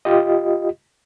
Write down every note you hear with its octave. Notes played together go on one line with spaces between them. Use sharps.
F4 G4 D#5